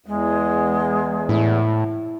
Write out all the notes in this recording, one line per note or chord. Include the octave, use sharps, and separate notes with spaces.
E2 G#3
A2 E4